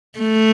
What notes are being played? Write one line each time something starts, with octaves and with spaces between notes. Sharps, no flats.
A3